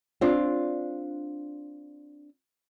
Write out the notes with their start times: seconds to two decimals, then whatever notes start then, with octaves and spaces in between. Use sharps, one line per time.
0.21 C4 D4 F4